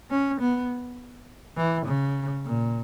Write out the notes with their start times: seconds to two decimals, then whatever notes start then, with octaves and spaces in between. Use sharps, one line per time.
0.11 C#4
0.41 B3
1.57 E3
1.86 C#3
2.45 A#2